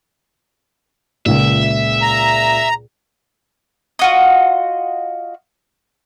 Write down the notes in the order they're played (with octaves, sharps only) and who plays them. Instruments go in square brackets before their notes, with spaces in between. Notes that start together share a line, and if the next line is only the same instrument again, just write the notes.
[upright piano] C#2 A#2 [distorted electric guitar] E5
[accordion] A#5
[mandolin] F4 F#4 D#5